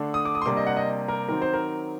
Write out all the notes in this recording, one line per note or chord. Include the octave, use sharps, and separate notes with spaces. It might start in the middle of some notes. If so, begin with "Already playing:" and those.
Already playing: D3 A3 D4
D#6
D6
D#6
C6
C3 G3 A#3 D4 D6
D#5
F#5
D#5
A#4
D#3 F#3 C4 A#4
C5
A#4